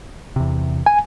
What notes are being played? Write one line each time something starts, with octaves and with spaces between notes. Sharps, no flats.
E2 C3
G#5